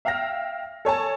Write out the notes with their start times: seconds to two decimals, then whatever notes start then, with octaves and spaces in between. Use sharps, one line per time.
0.05 E5 F5 G5 F6 A#6
0.85 A4 C#5 G#5 A5